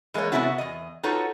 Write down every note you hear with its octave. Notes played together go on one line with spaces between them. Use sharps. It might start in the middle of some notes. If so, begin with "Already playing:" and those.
E3 G#3 A#3 C5 C#5
C3 E3 B3 C#4 E4 F#4
E2 D#5
D#4 F4 F#4 A4 B4 C#5